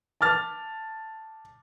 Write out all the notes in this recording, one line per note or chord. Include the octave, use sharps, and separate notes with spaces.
A5 D6 F6 A6